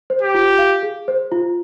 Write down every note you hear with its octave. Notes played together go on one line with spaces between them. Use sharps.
C5
G4
F4
F5
G#4
C5
F4